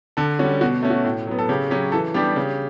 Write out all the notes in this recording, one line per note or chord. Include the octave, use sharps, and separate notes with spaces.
D3 A4
G3 C#4 F#4
B2 F#4
A3 C#4
F#4
A2
F#3 B3
A4
C#3 G4
F#3 C#4 G4
E3 A4
G3 B3 D4 G4
C#3